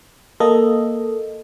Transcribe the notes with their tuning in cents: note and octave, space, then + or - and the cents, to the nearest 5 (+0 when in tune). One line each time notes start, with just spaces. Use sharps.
A#3 +0 A4 +0 D#5 +0